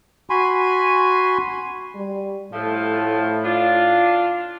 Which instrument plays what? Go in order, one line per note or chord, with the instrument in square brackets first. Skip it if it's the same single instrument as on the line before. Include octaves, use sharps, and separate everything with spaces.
[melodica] F#4 G#5 B5 C6
[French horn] G3
[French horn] A2 [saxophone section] F3 A3
[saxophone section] D4 F4